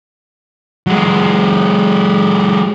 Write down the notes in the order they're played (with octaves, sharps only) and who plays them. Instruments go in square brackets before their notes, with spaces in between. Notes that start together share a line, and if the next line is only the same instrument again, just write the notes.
[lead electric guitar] F#3 G#3